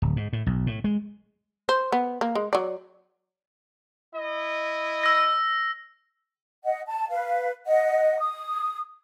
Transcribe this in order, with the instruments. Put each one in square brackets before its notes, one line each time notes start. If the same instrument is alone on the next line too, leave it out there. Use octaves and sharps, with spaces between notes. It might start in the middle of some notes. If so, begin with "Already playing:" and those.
[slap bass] D1
G#2
A2
B1
A2
G#3
[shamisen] C5
B3
A#3
G#3
F#3 D5
[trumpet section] E4 D#5
[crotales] E6 A#6
[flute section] D#5 F#5
A5
B4 F5
D#5 F#5
D#6